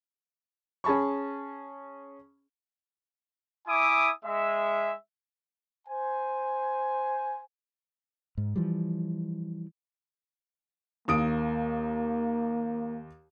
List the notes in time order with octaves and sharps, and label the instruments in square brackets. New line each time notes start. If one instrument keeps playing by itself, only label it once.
[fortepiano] C#4 G#4 A5 B5 C#6
[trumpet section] E4 E5 G#5 D6 D#6
G#3 E5
C5 G#5
[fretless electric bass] G#2
E3 F3 G3
[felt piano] D#2 D#6 D7 [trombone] A#3